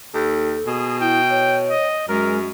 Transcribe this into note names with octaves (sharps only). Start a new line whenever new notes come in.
D#2 A4
B2 G#4
E4 G5
C#5
D#5
F#2 G#3 A#4